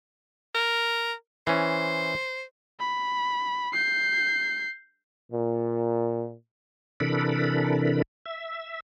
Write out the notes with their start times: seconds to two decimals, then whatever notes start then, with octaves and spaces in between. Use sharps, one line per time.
0.55 A#4
1.47 E3 C#4 C5
2.80 B5
3.73 G6 C7
5.32 A#2
7.00 C3 E3 D4 A4 A#4 B5
8.26 E5